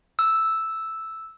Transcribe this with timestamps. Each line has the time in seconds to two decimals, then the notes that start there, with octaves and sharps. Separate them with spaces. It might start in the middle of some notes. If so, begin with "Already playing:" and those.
0.19 E6